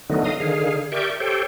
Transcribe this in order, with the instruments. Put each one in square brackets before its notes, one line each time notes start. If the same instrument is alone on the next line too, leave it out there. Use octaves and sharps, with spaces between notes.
[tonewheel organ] D3 D#3 F#3 A3 B3 D#4
D#5 F5 D#6
D3 D#3 G#4 F5
G4 A#4 D5 E5 C#6 G6
G4 A4 C5 C#5 G5